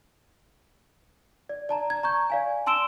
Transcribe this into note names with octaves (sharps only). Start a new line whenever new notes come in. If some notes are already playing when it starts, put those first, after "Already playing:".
D5
D5 A5 A#5
G#6
A#5 C#6 G6
D5 F5 G#5
A5 C6 E6 D7 E7 G7